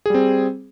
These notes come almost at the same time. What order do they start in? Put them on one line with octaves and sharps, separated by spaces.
G#4 G3 C4